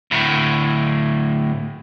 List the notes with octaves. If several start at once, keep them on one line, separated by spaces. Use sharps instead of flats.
D2 A2